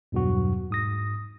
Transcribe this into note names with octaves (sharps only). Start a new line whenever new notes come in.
E2 G2 B2 F#3 F#4
G#2 D#6 A#6